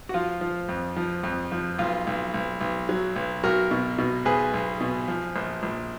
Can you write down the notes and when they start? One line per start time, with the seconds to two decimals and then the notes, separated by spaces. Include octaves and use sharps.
0.09 F#4
0.14 F3 F4
0.41 F3
0.69 F2
0.96 F3
1.23 F2
1.52 F3
1.78 B1 F4
2.07 B1
2.34 B1
2.61 B1
2.89 F#3
3.16 B1
3.44 B1 F#4 A#4
3.71 B2
3.98 B2
4.25 B1 G#4 B4
4.54 B1
4.81 B2
5.08 F3
5.36 A#1
5.63 A#1